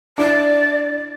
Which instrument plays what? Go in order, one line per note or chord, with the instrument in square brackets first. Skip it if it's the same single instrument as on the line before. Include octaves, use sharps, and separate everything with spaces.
[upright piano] D4 E4 [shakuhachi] D5